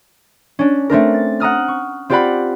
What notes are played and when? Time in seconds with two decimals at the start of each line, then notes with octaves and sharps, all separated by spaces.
0.59 C#4 D4
0.90 A3 C4 D4 A#4
1.14 A6
1.40 F#5 A#5 D#6 F6
1.68 C#6
2.10 C4 F4 G4 D5 F#5 B5